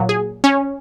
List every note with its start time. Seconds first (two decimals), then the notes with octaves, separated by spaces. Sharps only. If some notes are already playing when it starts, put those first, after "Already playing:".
Already playing: A#2 F#3
0.09 G#4
0.44 C#4